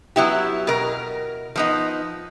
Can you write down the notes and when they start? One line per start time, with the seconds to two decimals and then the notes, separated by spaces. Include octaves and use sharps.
0.16 F#3 B3 E4 G4
0.67 B2 A#4
1.56 F3 B3 D#4